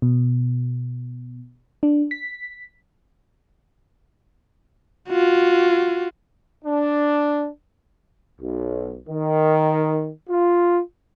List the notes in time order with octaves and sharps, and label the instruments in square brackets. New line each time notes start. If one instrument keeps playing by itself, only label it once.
[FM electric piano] B2
D4
B6
[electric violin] F4 F#4
[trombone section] D4
B1
D#3
F4